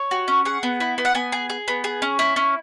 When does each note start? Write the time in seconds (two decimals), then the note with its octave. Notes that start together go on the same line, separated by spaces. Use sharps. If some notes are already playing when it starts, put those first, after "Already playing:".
Already playing: C#5
0.11 F#4
0.28 C#4
0.45 G#4 F#5
0.63 B3
0.80 E4
0.98 B3
1.05 F#5
1.15 B3 G#5
1.32 G#4
1.50 G#4
1.68 B3
1.84 G#4
2.02 C#4
2.19 E4
2.36 C#4